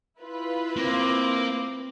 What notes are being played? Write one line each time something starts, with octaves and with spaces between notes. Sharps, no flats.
E4 F4 B4
A#3 C4 D6